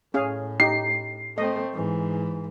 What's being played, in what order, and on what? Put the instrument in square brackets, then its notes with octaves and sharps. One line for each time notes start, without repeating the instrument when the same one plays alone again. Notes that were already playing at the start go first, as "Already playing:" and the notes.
[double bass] A2 [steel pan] C#4 G#4 F5
[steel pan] D#4 G4 [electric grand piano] C7
[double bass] A3 C4 [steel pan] D#5
[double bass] G#2 E3